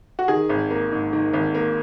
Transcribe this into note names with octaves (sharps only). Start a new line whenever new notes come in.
F#4
D#3 G#4
G#1
A#3
G#2
D#3
G#1
A#3